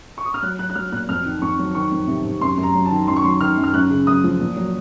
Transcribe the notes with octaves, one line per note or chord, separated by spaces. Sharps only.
C#6
D#6
F6
F#3 F#6
F#3 F#6
F#6
F#3 F6
A#2 F#6
F2 F6
D#3
F2 C#6
F#3
D#3 C#6
F2
C3
C3
F#2 C6
F#2
A#5
F#3
A5
D#3
F#2 C6
C#6
F#3 C6
D#3 F6
F#2
F6
F#2 F#6
C#3
F#2 D#6
F3
A#2
F#3